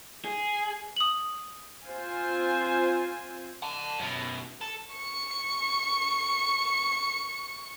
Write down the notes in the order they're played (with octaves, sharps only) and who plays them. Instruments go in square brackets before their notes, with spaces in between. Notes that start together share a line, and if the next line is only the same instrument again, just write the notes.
[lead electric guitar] G#4
[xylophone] D#6 F#7
[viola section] C4 F4 C5 G#5
[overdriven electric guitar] F#5 A5
F#2 B2
A4
[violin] C#6 C#7